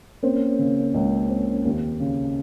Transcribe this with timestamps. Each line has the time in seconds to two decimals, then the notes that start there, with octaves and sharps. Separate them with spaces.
0.23 A#3 C4 C#4
0.59 C#3
0.94 C#2
1.29 C4
1.65 D#2
2.00 C#3